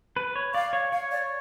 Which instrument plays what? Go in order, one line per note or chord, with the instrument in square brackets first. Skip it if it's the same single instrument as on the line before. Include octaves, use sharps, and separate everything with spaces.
[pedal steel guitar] B4
C#5
[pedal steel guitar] D5 [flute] F5
[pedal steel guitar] C#5
[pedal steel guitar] C#5 [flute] F5
[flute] D5